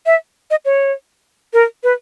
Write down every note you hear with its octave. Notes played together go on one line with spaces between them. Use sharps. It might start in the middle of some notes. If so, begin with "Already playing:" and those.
E5
D#5
C#5
A#4
B4